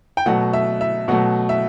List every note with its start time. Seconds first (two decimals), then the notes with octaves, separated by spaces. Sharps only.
0.17 G5
0.26 B2 F#3 A3 F#5
0.53 E5
0.81 E5
1.08 B2 F#3 A3 F#5
1.49 E5